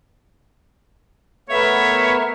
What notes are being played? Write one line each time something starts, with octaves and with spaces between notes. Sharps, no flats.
A3 B3 A#4 C#5 E5